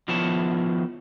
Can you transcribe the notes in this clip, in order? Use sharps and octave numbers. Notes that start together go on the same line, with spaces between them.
D#3 F3 B3 E4 C#5 A5